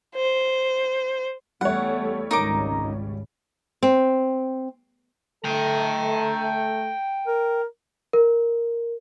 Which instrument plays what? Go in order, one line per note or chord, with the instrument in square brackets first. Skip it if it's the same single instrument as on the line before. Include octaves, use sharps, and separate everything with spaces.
[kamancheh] C5
[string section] E2 A3 [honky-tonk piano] G3 C#5 [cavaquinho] F#5
[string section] G#1 C#2 [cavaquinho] D#4 A#4 D6
[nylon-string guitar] C4
[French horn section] A3 A4 [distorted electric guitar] G5 A#5
[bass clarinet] A#4
[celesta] A#4